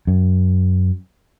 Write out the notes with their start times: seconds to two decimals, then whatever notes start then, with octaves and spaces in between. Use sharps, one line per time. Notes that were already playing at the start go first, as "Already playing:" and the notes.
0.07 F#2